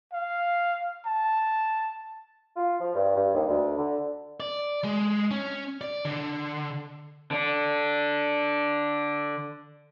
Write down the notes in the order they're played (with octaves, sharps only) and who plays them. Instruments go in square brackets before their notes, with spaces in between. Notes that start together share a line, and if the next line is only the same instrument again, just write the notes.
[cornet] F5
A5
[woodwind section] F4
F3
G2
G2
D#2
D2
D3
[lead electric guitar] D5
G#3
C#4
D5
D3
[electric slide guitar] D3 D4